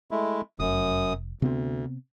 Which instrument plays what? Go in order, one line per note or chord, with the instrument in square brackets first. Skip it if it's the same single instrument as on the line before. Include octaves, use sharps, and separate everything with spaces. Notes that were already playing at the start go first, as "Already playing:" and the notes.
[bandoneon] G#3 A3 E4
[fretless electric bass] F1 [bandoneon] F#2 D#6
[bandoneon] D2 [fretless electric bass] C3 B3 C4